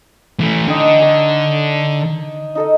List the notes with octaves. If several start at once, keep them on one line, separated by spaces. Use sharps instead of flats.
E3 A3
D3 D#4 G5
G#5 A#5 C#6
D#4 A4 D#5